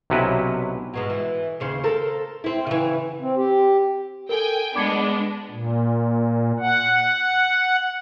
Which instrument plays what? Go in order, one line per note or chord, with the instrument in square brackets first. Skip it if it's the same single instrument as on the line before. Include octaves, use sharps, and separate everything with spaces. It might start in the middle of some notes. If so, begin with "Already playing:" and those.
[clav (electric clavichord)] B1 C3 F#3 C#4 E4 B4
[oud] G#2 B2 F#3
E3
D#2 C#3 C5
A4 A#4 C5
C4 E4
C#3 E3
[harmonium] C4
G4
[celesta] A4 A#4 [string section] G5 G#5
[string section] G#3 B3 D4 [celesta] D6 G#6 C#7
[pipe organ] A#2
F#5